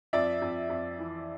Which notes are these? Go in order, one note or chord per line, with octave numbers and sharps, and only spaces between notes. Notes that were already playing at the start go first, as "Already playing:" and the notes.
F2 D5 E5
F2
F2
E3